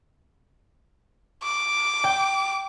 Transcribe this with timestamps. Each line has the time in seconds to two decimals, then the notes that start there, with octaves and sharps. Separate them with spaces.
1.43 D6
2.04 G5